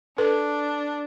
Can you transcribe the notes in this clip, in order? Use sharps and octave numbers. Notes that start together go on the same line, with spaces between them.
D4 A4 B4